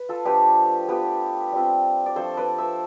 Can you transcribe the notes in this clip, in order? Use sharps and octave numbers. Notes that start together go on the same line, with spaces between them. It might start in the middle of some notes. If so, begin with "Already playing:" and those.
Already playing: B4
F4 A4
F3 A3 D4 G4 B4
B3 F4 G4 B4
G3 C4 F4
D5
F3 A3 D4 A4 C5
B4 D5
C5 E5